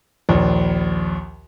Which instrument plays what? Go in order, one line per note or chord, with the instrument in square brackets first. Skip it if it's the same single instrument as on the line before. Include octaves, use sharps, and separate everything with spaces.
[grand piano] A#1 D#2